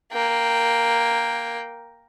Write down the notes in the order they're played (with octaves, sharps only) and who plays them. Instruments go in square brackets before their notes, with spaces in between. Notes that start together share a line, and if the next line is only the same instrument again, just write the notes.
[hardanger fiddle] A#3 G5